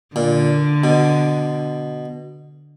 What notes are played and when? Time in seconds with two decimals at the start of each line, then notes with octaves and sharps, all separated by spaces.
0.16 A#2 D3
0.84 B2